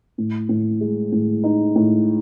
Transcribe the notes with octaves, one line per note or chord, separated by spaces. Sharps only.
A2
A2
G#3
A2
D#4
A2